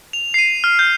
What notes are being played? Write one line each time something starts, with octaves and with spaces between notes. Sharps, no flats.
F7
C7
D#7
F6
G6